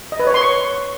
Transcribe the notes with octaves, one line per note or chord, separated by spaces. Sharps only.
D#5
B4
C#5
C6
C#6